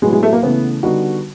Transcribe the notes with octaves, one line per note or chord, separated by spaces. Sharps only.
A2 F#3 G#3 B3 E4
G#3
A3
A#3
C#3 E3 A3 B3
D3 G3 B3 D#4 F#4